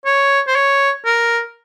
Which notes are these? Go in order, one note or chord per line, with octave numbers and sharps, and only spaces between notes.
C#5
C5
C#5
A#4